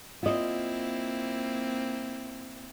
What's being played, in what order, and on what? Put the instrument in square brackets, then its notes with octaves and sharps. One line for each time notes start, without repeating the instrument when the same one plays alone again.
[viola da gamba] A#3 C4 E4 [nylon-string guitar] F4 D#5